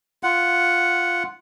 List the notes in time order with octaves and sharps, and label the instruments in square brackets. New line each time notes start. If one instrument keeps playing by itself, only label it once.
[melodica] F4 F#5